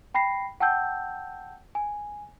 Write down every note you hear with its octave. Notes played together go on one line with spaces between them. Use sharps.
G5 B5 A#6 C7
F#5 G5 A5 E6 G6
G#5